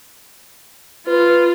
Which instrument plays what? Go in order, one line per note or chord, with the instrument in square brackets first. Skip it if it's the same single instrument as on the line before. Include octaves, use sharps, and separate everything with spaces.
[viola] F4 [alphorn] B4